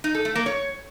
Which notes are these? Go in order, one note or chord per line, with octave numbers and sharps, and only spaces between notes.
D#4
A4
A3
A#3
C#5